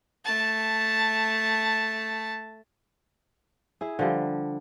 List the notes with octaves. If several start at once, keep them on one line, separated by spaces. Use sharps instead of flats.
A3 A5
E4 G#4
D3 F3 G3